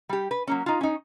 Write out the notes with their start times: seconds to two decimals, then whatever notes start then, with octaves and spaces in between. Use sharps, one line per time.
0.09 G3 G4
0.31 B4
0.47 F#3 A#3 C#4
0.66 D#4 F4
0.81 C#4 D#4